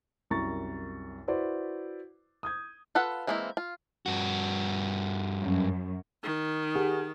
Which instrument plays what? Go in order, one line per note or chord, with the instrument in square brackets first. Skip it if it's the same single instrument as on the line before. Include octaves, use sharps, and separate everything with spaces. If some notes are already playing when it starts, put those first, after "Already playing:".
[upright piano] C2 F#2 A#5 C#6 A6
E4 F#4 B4 C5 D5
D#6 G6 G#6
[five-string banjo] F4 A4 B4 F#5
E3 G#3 A#3 C4 E4
F4
[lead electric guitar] G2 F#4
[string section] F#2
[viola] D#3
[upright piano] G4 G#4 F#5